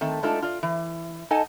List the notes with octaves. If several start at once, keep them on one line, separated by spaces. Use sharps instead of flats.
D#3 A3 C4
G#3 A3 D4 D#4 F4 A4
F4 D5
E3
D#4 A4 D#5 F#5 G#5 A5